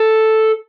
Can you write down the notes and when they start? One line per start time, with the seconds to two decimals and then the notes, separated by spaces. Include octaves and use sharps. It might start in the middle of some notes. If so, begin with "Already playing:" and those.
Already playing: A4